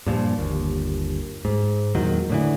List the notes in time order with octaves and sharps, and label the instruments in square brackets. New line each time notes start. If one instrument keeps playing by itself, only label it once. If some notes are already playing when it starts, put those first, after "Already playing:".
[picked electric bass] G2 A#2 F3
G1 D#2
G#2
E2 A#2 D#3 F#3
A2 D3 E3